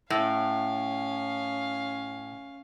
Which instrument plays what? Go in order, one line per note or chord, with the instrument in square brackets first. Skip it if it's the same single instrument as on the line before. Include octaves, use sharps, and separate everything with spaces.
[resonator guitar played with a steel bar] A2 [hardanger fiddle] C#4 F5